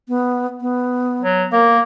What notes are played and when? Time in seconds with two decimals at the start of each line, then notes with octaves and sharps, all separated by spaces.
0.08 B3
0.61 B3
1.22 F#3
1.52 A#3 A#4